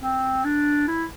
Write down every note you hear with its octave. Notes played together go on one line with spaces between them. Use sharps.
C4
D4
E4